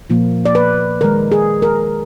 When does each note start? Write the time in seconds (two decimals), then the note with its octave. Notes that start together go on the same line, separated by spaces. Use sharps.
0.10 A#2 F3 A#3
0.45 D5
0.55 B4
1.01 D#3 G#3 A#4
1.32 G#4
1.62 A#4